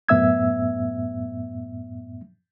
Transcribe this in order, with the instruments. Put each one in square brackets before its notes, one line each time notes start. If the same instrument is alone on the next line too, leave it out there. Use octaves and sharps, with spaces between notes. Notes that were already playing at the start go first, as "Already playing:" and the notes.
[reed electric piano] F#2 A2 B3 E5 E6 G#6